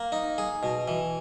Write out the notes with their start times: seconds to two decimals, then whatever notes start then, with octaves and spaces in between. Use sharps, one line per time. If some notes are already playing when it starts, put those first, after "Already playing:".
Already playing: A#3
0.12 D#4
0.38 G#4
0.63 B2
0.88 E3